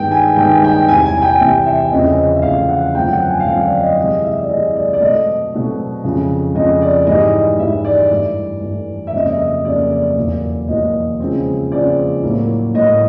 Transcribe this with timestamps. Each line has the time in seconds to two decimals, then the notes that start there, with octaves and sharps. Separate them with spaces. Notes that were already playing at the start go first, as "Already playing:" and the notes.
Already playing: G2 D#3 G#3 B3 G5
0.11 G#5
0.36 G2 D#3 G#3 B3 G5
0.50 G#5
0.64 G5
0.88 E2 C3 E3 G#5
1.06 G#5
1.17 G#5
1.22 G5
1.39 E2 C3 E3 E5
1.65 E5
1.91 E2 C#3 F3 A3 C4 D#5
2.17 D#5
2.36 E5
2.42 E2 C#3 F3 A3 C4 F5
2.69 F#5
2.95 F#2 D3 F3 A3 C4 G5
3.12 F#5
3.29 G#5
3.40 F5
3.46 F#2 D3 F3 A3 C4 F#5
3.64 D5
3.81 D#5
3.97 C3 E3 G#3 D#5
4.24 E5
4.39 D5
4.49 C3 E3 G#3 D#5
4.75 D5
4.93 D5
5.00 B2 F#3 A3 C4 D#5
5.52 B2 F#3 A3 C4
6.04 F2 C#3 F3
6.55 F2 C#3 F3 D#5
6.82 D5
7.06 G#2 E3 G3 D#5
7.32 D#5
7.58 G#2 E3 G3 E5
7.85 D5
8.10 G2 E3 A3
8.62 G2 E3 A3
9.07 E5
9.13 F2 C#3 F#3 A#3 D#5
9.28 D#5
9.39 E5
9.64 F2 C#3 F#3 A#3 D5
9.91 D5
10.17 E2 B2 F#3 A#3
10.68 E2 B2 F#3 A#3 D#5
11.20 C#3 F3 G#3 C4
11.72 C#3 F3 G#3 C4 D5
12.22 A2 F#3 A#3
12.74 A2 F#3 A#3 D#5